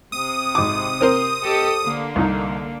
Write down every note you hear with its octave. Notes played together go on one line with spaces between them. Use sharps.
C3 D#6
G#1 D6
C4 A#4 C5
G4 A4 D#5
D3 A#3
C2 D#4